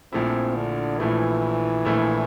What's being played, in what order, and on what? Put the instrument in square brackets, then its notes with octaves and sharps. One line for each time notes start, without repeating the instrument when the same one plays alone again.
[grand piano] A#1 A#2 F3 A3 E4 [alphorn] C4
[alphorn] D3
[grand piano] A#1 A#2 F3 A3 E4 [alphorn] E3
[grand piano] A#1 A#2 F3 A3 E4